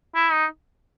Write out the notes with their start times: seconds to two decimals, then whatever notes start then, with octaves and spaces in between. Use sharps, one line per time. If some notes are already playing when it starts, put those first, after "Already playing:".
0.15 E4
0.32 D#4